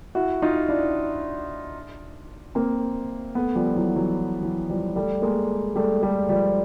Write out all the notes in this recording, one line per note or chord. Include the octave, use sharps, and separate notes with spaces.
E4 F#4
D#4 F4
D4 E4
A#3 C4
A3 B3
F3 G3
E3 F#3
E3 F#3
E3 F#3
F3 G3
G3 A3
G#3 A#3
G3 A3
G3 A3
F3 G3